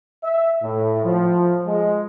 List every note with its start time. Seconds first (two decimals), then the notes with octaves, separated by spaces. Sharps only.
0.23 E5
0.63 A2
1.04 F3
1.67 G#3